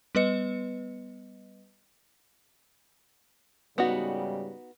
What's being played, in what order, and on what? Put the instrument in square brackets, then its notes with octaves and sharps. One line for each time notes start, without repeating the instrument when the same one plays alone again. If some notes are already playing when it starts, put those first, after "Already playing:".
[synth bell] G3 B3 B4 D#5 C#7
[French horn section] G#2 C#3 G3 [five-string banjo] B3 D#4 F#4